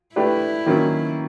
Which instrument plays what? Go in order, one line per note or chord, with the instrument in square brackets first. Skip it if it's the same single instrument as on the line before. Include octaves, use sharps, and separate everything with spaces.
[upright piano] A3 D4 G4 B4 [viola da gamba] E4
[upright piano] D#3 F#3 A#3 C#4